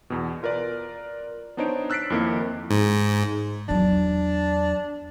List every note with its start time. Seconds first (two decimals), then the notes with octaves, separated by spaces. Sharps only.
0.10 E2 B2
0.43 F4 A#4 B4 D5
1.57 B3 D4 D#4 C5 C#5 D7
1.90 E6 F#6 A6 B6 C7 D7
2.10 F2 D#3 A#3 E4
2.70 G#2
3.68 E2 F#3 D4